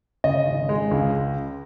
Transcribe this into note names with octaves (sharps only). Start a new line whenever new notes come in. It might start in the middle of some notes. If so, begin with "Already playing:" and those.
C#3 D#5
G#1
G#3
C#2